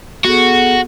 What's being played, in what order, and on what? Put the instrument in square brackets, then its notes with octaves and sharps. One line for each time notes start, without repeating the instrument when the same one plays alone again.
[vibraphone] B3 G#4 A4 [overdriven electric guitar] F#4